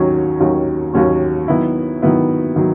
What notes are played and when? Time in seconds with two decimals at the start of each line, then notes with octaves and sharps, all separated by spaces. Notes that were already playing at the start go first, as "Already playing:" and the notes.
Already playing: D#2 D#3 F#3 C#4 F#4
0.40 D#2 D#3 F#3 C#4 F#4
0.94 D#2 D#3 F#3 C#4 F#4
1.48 D#3 F#3 B3 E4
2.02 D#3 F#3 B3 E4
2.56 D#3 F#3